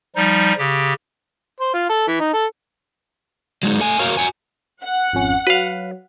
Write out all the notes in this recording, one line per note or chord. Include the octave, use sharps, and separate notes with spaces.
F3 G3 D#4
C#3 G4
C5
F4
A4
E3
D#4
A4
F#3 G#3 D#4
A3 G#5
F#4 A#4 C#5 F5
F#4 F#5 G#5
F#5
G#1 F2 C#4
F#3 B4 F5